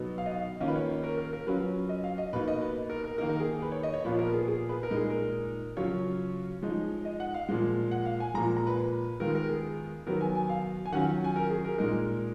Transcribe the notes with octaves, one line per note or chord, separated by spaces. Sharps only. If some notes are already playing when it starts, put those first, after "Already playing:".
Already playing: B2 F#3 B3 D#4
F5
D#5
F5
D#3 A#3 C#4 F4 D#5
B4
C#5
C#5
A#4
A#4
A#4
F#3 C#4 F4 B4
D#5
F5
D#5
B2 A#3 D#4 B4
D#5
B4
A#4
A#4
D#3 A#3 D#4 A#4
A#4
G#4
G#4
B4
C#5
D#5
C#5
A#2 F3 B3 F4 B4
A#4
G#4
G#4
B4
A#4
A#2 G#3 D#4
G#4
A#4
C#3 F#3 C#4 F4 C#5
F3 G#3 D#4
D#5
F#5
F5
A#2 F3 G#3
F#5
F5
G#5
A#2 F3 G#3 A#5
A#5
B4
D#3 G#3 B3 F4 A#4
A#4
G#4
D#3 F#3 B3 A#4
G#5
G#5
F5
G#5
D#3 F#3 C#4 F4 F#5
G#5
A#4
G#4
A#4
A#2 G#3 D#4 A#4